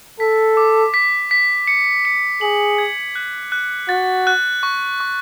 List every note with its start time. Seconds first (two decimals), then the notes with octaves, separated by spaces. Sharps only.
0.20 A4 B6
0.57 D6
0.94 B6
1.31 B6
1.67 C#7
2.05 C#7
2.41 G#4 F#7
2.78 G#6
3.15 F#6
3.52 F#6
3.89 F#4 A6
4.27 F#6
4.63 C#6
5.00 C#6